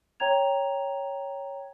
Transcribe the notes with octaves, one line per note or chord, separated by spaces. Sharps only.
C#5 G5 A#5 G#6 F7